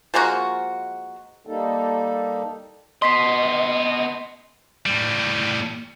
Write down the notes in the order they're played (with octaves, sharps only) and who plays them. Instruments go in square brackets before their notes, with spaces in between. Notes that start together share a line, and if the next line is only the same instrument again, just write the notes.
[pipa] F3 G#3 A#3 F#4
[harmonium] G3 A#3 D#4 A4
[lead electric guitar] B3 D#5 [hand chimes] C6 B6 C7
[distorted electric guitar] A2 G3